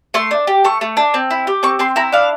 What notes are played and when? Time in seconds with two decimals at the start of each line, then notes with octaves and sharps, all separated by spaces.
0.14 A3 C6
0.31 D4
0.47 G4
0.64 A3 C#6
0.81 A3
0.97 D4
1.14 C4
1.31 E4
1.47 G4
1.63 C4 C#6
1.79 C4 C6
1.96 E4 A#5
2.12 D4 F5